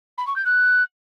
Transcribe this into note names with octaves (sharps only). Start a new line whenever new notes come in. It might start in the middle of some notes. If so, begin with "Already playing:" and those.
B5
C#6
G6
F#6